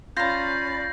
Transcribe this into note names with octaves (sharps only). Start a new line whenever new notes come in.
C#4 F4 D5 A#5 B5 G6 A#6 C7